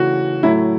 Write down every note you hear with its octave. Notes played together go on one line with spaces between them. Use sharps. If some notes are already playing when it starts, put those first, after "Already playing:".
Already playing: C#3 E3 A3 F#4
A2 F#3 A3 E4